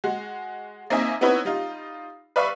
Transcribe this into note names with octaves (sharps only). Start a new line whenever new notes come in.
G#3 F#4
A#3 C4 D#4 D#5 E5 G#5
B3 C4 D#4 E4 B4 C#5
G3 D#4 F4
B4 D5 E5 F5 B5 C#6